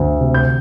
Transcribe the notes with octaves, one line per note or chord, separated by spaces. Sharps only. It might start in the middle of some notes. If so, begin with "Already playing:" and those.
Already playing: D2
C3
G6